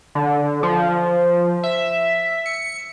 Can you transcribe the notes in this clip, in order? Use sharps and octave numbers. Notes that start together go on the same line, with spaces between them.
D3
F3
E5
C#7